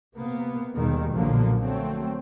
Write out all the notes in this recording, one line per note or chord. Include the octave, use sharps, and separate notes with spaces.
C3 A#3 B3
D#2 B2 D#3 G3 G#3
B1 A#2 D3 F3 F#3 A#3
F#3 A3 C4